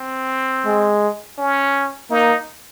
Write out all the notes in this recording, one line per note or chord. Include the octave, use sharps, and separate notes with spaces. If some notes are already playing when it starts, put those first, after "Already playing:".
Already playing: C4
G#3
C#4
A#3 D#4